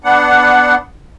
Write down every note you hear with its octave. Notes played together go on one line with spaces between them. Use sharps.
B3 D4 F#5